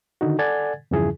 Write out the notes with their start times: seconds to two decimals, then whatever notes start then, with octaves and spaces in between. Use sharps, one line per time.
0.21 D3 D#3 D#4 F#4
0.39 A4 D5 F#5 G#5 G#6 A6
0.91 E2 G2 C#3 F3 E4 G#4